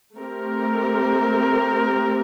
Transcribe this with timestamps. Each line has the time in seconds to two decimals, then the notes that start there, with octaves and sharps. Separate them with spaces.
0.17 A3 C4 G4 A#4